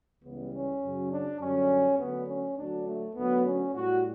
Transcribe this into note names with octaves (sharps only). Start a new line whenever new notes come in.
C#2 C#3 E3 G3 B3
C#4
F#2 C#3 F#3
D4
F#2 D3 G3 C#4
D2 D3 F#3 B3
C#4
D2 D3 F#3 D4
A3
D2 D3 F#3 B3
C#4
A2 G3 F#4